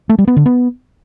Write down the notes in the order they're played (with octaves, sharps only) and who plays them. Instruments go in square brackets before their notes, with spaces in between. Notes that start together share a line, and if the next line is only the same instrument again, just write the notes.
[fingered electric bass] A3
G3
B3
D3
B3